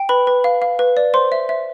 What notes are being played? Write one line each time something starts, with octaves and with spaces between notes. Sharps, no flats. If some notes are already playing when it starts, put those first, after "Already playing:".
Already playing: G5
B4 B5
B4
F5
F5
B4
D5
C5 C6
E5
E5